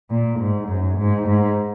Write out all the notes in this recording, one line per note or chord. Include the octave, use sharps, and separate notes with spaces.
A#2
G#2
F#2
G#2
G#2